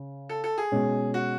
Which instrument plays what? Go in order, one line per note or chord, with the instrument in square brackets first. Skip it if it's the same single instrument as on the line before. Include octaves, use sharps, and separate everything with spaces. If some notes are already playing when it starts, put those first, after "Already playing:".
Already playing: [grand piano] C#3
[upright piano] A4
A4
G#4
[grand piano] B2 G#3 C#4
[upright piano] F#4